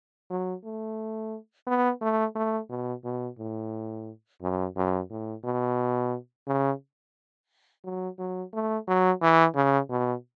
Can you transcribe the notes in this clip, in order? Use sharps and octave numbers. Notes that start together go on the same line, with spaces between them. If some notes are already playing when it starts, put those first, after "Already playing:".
F#3
A3
B3
A3
A3
B2
B2
A2
F#2
F#2
A2
B2
C#3
F#3
F#3
A3
F#3
E3
C#3
B2